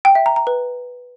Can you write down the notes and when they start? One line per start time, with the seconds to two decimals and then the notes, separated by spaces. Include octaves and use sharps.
0.05 G5
0.15 E5
0.26 A#5
0.36 A#5
0.47 B4